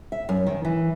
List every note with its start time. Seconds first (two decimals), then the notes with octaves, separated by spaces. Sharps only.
0.12 E5
0.29 F#2
0.47 D#3
0.65 E3